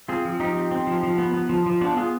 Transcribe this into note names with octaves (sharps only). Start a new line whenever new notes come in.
C4 F4 G#4
F3
F3 D#4 G4
C4
C4
F3
F3
B3
B3
F3
F3
B3 D4 F4
B3 F4 G#4